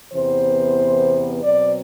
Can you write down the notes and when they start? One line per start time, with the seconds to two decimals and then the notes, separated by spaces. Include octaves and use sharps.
0.12 E2 C3 E3 B3 C5
1.43 B2 F#3 C4 D5